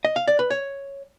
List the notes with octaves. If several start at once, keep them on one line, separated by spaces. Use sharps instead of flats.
D#5
F5
D5
B4
C#5